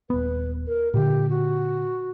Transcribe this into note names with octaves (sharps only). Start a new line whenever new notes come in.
D#1 B3 B4
A#4
A#2 D3 G4
F#4